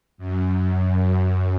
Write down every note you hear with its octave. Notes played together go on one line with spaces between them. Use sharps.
F#2
F#2